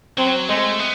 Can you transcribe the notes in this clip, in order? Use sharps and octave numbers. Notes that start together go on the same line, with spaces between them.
F#3 C4
G#3 A3
B3